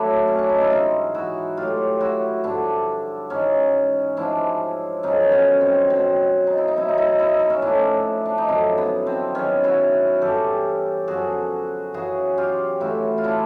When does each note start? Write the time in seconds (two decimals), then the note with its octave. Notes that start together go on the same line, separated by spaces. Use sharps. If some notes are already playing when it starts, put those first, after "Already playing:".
Already playing: A2 F#3 D4 E4
0.28 C#4
0.38 D4
0.49 D#4
0.61 E4
0.71 G#2 E3 D#4 F4
1.14 E4 F#4
1.57 A2 F#3 F4 G4
2.00 E4 F#4
2.44 G2 D3 F3 D4 E4
3.30 G#2 E3 C#4 D#4
4.17 G#2 F3 D4 E4
5.03 F#2 D3 F3 C#4 D#4
5.32 B3 C#4
5.61 C4
5.90 B2 F#3 C4
6.47 D#4
6.58 E4
6.68 D#4
6.76 B2 F#3 E4
6.89 D#4
6.98 E4
7.08 D#4
7.19 E4
7.29 D#4
7.39 E4
7.50 C#4 D#4
7.62 A2 F3 D4 E4
8.26 D4
8.38 D#4
8.48 F#2 D3 F3 D4 E4
8.78 B3
9.07 C4
9.34 G#2 D#3 F#3 B3 C#4
9.64 E4 F#4
10.22 G2 E3 G4 A4
11.08 F#2 D3 F3 F#4 G#4
11.94 F#2 C#3 E3 F#4 G#4
12.38 F4 G4
12.80 A2 E3 E4 F#4
13.18 F4
13.24 D4 E4